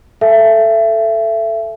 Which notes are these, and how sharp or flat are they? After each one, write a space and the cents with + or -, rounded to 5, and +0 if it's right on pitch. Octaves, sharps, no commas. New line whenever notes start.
A4 +0 E5 +25 G#5 +40